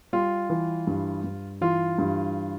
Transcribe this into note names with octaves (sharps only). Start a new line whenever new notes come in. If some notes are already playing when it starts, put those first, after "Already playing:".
G3 F4
E3
G2
G2
E3 F4
G2